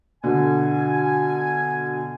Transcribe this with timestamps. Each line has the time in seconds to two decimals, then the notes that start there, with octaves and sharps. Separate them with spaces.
0.23 B2 D3 G#5